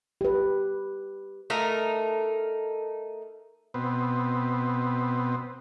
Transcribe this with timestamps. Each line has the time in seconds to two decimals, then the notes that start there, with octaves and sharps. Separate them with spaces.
0.21 G4 B4
1.50 A3 D#4 A#4
3.74 B2 B3 C4